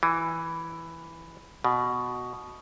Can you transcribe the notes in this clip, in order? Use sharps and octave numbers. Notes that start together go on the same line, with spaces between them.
E3
B2